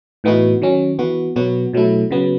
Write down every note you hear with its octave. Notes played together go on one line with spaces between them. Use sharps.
A2 E3 B3 D#4 F#4
D#3 F#3 C#4
E3 B3 F#4
B2 F#3 B3 F#4
B2 F#3 A3 E4
C#3 F#3 B3